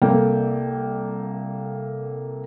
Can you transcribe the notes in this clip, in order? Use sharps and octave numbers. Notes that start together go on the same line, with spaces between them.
C2 A#3 A4 G5